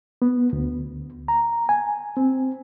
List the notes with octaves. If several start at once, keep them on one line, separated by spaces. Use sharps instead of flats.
B3
D2
A#5
G#5
C4